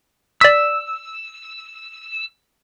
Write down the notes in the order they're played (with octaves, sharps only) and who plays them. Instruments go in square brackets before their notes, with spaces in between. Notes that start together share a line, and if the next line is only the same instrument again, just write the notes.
[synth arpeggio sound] D5 B6 [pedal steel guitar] E6